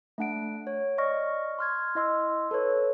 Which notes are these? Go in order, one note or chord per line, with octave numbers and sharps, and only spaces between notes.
A3 D4 F#5 D7
C#5
D5 D#5 C#6 F6 A#6
C6 F6 G#6
E4 D#5 C6 E6
A4 B4 C#5